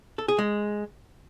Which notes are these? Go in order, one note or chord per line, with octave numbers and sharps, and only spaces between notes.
A4
G#4
G#3